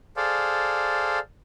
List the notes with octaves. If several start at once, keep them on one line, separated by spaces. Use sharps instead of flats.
G#4 A4 C5 D5 F5